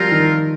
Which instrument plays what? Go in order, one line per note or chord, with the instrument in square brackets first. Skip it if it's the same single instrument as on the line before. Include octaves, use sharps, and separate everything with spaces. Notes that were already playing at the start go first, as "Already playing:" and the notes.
Already playing: [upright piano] F3 G3 [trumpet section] C4 F4 A#4
[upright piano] D#3